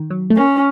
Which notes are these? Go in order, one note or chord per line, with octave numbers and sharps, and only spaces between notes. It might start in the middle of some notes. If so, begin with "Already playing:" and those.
Already playing: D#3
F#3
A3
A#3 C#4